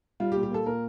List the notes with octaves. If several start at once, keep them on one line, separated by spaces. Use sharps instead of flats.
G3 F4
G4
A#2
G4
A#3 A4
A#2 A#4